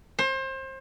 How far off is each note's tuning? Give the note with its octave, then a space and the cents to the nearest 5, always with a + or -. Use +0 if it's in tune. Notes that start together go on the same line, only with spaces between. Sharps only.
C5 +30